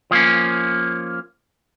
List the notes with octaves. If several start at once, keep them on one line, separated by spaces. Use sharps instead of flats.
F3 A#3 C#4